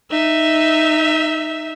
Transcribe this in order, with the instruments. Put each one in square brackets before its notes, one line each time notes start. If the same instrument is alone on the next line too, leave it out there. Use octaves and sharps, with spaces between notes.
[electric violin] D#4 E5